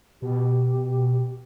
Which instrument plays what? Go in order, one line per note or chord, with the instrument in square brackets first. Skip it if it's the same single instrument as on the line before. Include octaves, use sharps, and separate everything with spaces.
[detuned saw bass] B2 [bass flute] G4